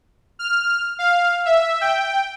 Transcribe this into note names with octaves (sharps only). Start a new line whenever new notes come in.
F6
F5
E5
G5